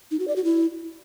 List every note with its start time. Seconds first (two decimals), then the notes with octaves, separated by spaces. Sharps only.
0.11 D#4
0.19 F#4
0.28 D5
0.36 F#4
0.44 E4